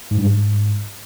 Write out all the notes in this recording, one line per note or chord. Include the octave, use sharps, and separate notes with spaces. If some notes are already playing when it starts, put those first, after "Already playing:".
G#2
G2
G#2